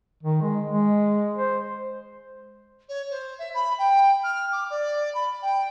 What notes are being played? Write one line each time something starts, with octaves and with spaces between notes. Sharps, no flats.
D#3
G#3
G#3
C5
C#5
C5
E5
B5
G5
F6
D6
D5
B5
G5